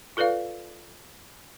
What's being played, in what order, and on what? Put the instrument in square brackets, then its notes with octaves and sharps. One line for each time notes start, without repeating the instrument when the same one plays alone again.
[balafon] F4 A4 B4 D5 F5